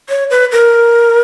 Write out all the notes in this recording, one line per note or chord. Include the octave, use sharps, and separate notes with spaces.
C#5
B4
A#4